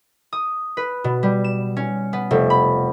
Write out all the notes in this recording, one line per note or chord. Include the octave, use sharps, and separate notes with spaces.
D#6
B4
B2
G3
E7
C#4
B3
F1
B5